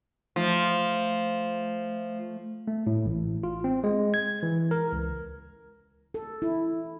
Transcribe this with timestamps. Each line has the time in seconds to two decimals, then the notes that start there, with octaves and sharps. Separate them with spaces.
0.36 F3 A3
2.68 A3
2.87 A2
3.06 A1
3.43 F4
3.64 C4
3.84 G#3
4.14 G#6
4.43 E3
4.71 A#4
4.92 C#2
6.14 A4
6.42 E4